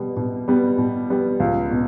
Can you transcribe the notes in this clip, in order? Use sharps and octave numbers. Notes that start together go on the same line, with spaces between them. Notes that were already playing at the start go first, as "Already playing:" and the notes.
Already playing: B2 G3 B3
B2
G3 B3
B2
G3 B3
C#2
B2